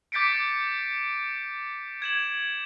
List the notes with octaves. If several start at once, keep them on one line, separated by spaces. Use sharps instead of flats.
D6 G6 A6 B6 C#7 D7
G#6 E7 F#7